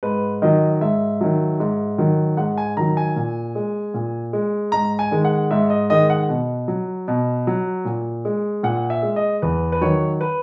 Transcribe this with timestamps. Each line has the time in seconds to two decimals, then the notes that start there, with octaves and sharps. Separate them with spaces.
0.03 G#2 B4
0.42 D#3 F#3 D#5
0.81 G#2 E5
1.21 D#3 F#3
1.60 G#2
1.98 D#3 F#3
2.37 G#2 F#5
2.58 G#5
2.77 D#3 F#3 A#5
2.97 G#5
3.16 A#2
3.55 G#3
3.94 A#2
4.33 G#3
4.72 G#2 A#5
4.99 G#5
5.11 D#3 G#3
5.25 F#5
5.51 G#2 E5
5.70 D#5
5.90 D#3 G#3 D#5
6.10 F#5
6.29 B2
6.68 F#3
7.08 B2
7.47 F#3
7.85 A#2
8.25 G#3
8.63 A#2 F#5
8.90 E5
9.03 G#3
9.16 D#5
9.42 E2 B4
9.72 B4
9.81 D#3 F#3 C#5
10.21 B4